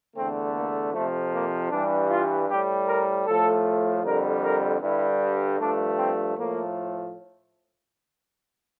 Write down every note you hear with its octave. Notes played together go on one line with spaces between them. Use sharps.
E2 D3 A3 C4
A#3
F2 C3 F3 A3
A#3
G2 E3 G3 D4
F4
A2 G3 G4
A#4
A2 F3 A3 A4
F2 D3 G3 A#4
A#4
G2 D3 G3 E4
G2 F3 A3 D4
C4
A2 F3 A3 A#3